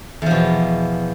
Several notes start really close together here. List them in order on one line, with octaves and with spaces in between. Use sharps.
E2 F3 B2